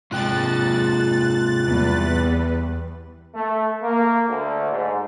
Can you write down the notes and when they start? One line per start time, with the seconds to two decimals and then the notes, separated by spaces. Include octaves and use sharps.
0.12 G#2 C3 G#3 F4 G5 F#6 A6
1.63 E2 G3 B4
3.33 A3
3.82 A#3
4.27 D2
4.71 G#2